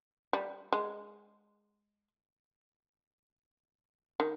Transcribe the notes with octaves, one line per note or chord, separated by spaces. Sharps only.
G3
G#3
D#3